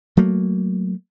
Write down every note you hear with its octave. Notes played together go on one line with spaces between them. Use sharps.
F#3 A3 A#3